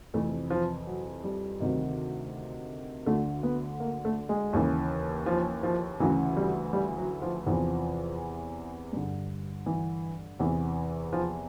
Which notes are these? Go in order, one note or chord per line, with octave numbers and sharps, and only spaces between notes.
F2 C3 E3 A3
F3
F#3
G3
D2 C3 D#3
D2 D3 A3
B3
A#3
A3
G#3
D#2 C#3 E3
F3
F3
D2 C#3 E3 F#3
G3
G3
F#3
F3
E2 C3 E3 F3
G2 D3
E3
E2 C3 E3
F3